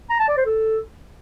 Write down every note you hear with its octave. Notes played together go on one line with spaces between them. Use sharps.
A#5
A5
D5
C5
A4